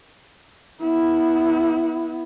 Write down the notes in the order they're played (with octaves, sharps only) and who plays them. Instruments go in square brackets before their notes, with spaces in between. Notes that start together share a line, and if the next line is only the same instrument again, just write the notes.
[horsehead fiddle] B3 E4